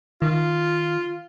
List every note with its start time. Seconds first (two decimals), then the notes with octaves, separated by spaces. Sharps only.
0.22 D#3 F4